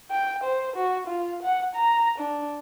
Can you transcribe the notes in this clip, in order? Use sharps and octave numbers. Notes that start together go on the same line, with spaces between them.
G5
C5
F#4
F4
F#5
A#5
D4